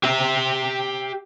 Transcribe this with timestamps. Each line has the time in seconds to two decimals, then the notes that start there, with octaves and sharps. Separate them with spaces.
0.04 G4 E5